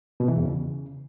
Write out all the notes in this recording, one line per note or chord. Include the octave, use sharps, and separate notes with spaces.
B2
E3
E2
C#3